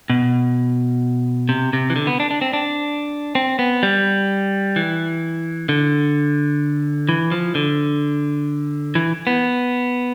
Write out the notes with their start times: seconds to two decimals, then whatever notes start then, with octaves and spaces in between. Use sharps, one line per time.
0.10 B2
1.49 C3
1.73 C3
1.90 E3
1.96 D3
2.07 B3
2.20 D4
2.31 D4
2.41 C4
2.53 D4
3.35 C4
3.59 B3
3.83 G3
4.76 E3
5.69 D3
7.09 E3
7.31 F3
7.55 D3
8.95 E3
9.27 B3